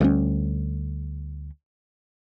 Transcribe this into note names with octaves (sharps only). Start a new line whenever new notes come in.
D2 G3 A#3 C#4